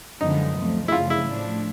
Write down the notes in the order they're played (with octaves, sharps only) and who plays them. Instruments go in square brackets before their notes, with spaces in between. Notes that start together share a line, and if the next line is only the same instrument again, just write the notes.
[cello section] F#2 D3 F3 G#3 B3 [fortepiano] D#4
[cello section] D2 C3 F3 A3
[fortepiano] E4
[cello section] F#2 C#3 F3 A3 [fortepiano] F4
[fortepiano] E4
[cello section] A2 F3 A3 D4